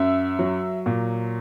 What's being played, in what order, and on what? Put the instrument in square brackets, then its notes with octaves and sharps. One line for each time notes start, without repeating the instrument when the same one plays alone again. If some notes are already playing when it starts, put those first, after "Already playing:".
Already playing: [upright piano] F#2 E5
F#3
A#2